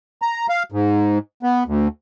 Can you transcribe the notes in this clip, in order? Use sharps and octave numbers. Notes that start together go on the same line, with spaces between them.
A#5
F5
G#2
B3
D2